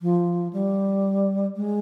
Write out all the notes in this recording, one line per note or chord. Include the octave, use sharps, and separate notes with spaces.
F3
G3
G#3